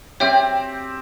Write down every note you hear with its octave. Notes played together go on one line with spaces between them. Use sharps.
C4 G4 C#5 E5 G5